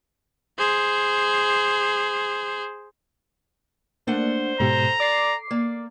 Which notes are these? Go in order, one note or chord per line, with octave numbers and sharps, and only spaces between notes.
G#4 C5
A3 A#3 D4 C5 F#5
G#2 B2 G4 A4 A#5
D5 D6 C7
A#3 D5